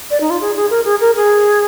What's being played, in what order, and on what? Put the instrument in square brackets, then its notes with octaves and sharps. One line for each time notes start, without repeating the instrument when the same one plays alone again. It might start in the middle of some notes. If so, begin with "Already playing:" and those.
[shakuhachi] D5
D#4
F4
G#4
G#4
A#4
G#4
A#4
G#4